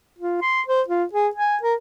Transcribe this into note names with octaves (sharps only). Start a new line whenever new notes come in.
F4
C6
C5
F4
G#4
G#5
A#4